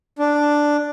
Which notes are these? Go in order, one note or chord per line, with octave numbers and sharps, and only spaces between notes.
D4